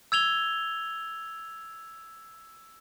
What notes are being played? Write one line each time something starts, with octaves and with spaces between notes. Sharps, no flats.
E6 G#6 F7 G7